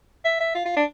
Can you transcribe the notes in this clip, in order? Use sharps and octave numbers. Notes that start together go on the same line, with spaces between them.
E5
E5
F4
F4
D4